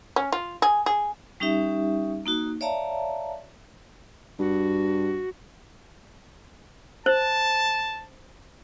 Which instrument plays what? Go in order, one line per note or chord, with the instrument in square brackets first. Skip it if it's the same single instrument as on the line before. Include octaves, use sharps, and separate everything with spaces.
[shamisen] C#4
F4
G#4
G#4
[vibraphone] G3 C#4 D#4 G4 E5
A#3 D#4 F#4
C#5 D5 E5 F5 A5 A#5
[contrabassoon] G2 [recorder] F#4
[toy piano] C5 [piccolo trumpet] A5